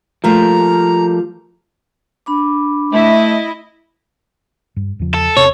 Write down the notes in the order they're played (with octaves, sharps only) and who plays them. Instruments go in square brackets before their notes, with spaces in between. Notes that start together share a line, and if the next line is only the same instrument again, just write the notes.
[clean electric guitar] F3 [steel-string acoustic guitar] G3 A3 A#3 [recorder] A#5
[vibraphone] D4 B5 D6
[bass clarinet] A3 [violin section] E4 D#5
[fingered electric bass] G2
E2 C#3 F3
[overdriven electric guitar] A4
[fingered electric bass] E1 C3 C#4 [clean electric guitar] C#5